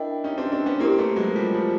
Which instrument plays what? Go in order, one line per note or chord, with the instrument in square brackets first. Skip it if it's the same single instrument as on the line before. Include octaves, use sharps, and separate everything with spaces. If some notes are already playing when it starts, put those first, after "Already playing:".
Already playing: [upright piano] D4 E4 [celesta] A#4 D#5 G5
[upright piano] C#4 D#4
C4 D4
C4 D4
B3 C#4
[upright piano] A#3 C4 [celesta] E4 G4 A#4
[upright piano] A3 B3
F#3 G#3
F3 G3
F3